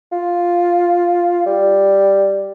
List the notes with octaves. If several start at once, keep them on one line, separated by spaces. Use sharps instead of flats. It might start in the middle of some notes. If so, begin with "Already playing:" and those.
F4
G3